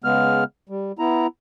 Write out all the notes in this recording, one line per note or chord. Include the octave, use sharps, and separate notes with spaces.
C#3 G#3 B3 F6
G3
B3 E4 A#5